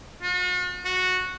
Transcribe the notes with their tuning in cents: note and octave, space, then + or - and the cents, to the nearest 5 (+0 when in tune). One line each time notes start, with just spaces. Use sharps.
F#4 -45
F#4 -10